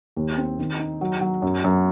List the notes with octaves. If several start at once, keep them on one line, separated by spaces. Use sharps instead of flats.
D#2
C4
D#3
D#4
F#3
F#3
F#2
F#2